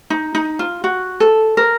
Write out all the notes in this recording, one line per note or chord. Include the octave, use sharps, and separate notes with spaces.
D#4
D#4
F4
F#4
A4
A#4